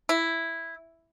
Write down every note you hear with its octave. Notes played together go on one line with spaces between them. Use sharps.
E4